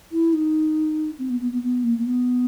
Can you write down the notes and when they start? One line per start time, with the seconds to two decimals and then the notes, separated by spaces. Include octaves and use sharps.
0.12 E4
0.33 D#4
1.19 C4
1.30 B3
1.40 B3
1.52 B3
1.62 B3
1.84 A#3
1.98 A#3
2.05 B3